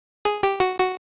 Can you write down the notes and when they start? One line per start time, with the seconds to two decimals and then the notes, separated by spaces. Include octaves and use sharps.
0.25 G#4
0.43 G4
0.60 F#4
0.79 F#4